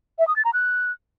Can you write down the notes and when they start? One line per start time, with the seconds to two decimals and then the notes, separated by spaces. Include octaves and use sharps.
0.19 E5
0.27 D#6
0.36 A6
0.45 A#5
0.53 F#6